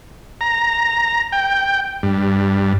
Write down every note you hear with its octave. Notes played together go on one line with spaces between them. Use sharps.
A#5
G5
G2